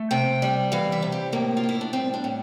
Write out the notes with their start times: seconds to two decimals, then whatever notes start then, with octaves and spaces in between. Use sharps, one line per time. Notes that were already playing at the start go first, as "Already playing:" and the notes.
Already playing: A3
0.11 C3 G5
0.42 G3
0.72 E3 F5
0.92 E5
1.02 C3
1.12 G4
1.33 A2 A#3
1.57 F4
1.64 A2
1.69 E4
1.81 D4
1.93 G3 C4
2.14 D4
2.24 A2